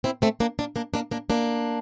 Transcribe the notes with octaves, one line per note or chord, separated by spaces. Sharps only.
C4 E4
A3 C4
A#3 D4
A#3 D4
A#3 D4
A#3 D4
A#3 D4
A#3 D4